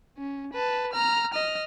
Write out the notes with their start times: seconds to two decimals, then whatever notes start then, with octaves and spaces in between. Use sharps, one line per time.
0.18 C#4
0.53 B4 A5
0.93 A#5 F6
1.33 D#5 F6